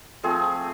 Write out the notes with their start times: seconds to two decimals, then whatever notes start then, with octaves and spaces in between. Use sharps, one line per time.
0.23 F3 A3 C4 G#4